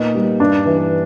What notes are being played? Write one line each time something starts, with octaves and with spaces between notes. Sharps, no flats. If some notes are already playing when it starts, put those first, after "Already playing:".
Already playing: A#2 B3 D#4
G3
G2 D4
E3